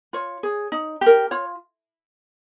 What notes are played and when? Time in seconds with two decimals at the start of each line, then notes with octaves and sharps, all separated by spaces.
0.13 F4 C#5
0.43 G#4
0.72 D#4
1.01 G4 A#4
1.31 F4 C#5